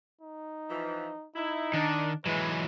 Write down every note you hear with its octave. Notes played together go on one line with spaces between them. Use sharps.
D#4
E3 F3
D#4 E4
D#3 D4
E3 F#3 G#3 B4